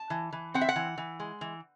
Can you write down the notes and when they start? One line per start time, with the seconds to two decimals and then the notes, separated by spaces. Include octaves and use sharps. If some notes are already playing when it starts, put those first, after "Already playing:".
Already playing: A5
0.10 E3
0.33 E3
0.54 C4 F#5
0.61 E5
0.69 F#5
0.76 E3
0.98 E3
1.20 G#3
1.41 E3